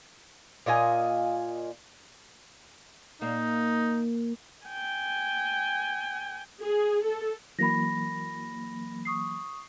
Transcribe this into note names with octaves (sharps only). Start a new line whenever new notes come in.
A#2 F4 D#5 G#5
A#2 A#3 D#4 E5
G5 G#5
G#4
A4
E3 F#3 A#3 B5 A#6
C#6 D#6 C7